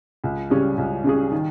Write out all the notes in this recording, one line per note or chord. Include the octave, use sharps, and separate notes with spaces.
C#2
C#3 G3 C#4 G#4
C#2
C#3 G3 C#4 G#4
D#3